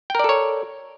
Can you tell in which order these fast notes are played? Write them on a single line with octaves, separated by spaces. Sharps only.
G5 A#4 D5 A4 C#5